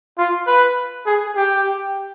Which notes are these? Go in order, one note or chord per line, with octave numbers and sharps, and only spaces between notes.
F4
B4
G#4
G4